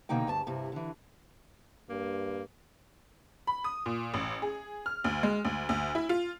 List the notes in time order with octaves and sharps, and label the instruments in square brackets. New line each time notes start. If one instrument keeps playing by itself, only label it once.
[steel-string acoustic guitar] B2 D3 A#3 D#4 G5
D2 G2 A5
G2 C3 E4
D3 E3
[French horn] G2 [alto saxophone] A#3
[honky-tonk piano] B5
D#6
A#2
A1
G#4
F6
D2
G#3
D2
D2
E4
F4